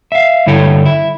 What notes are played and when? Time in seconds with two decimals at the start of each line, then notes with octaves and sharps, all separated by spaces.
0.12 E5 F5
0.46 G2 D3 E4 A4 C#5 G5
0.85 E4